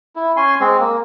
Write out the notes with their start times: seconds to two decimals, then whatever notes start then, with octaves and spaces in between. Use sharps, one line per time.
0.16 E4
0.37 C#4 G#5 C6
0.60 G#3 C4
0.80 A#3